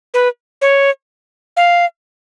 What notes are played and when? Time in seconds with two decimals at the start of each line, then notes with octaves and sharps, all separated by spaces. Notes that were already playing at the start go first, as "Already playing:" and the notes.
0.14 B4
0.62 C#5
1.57 F5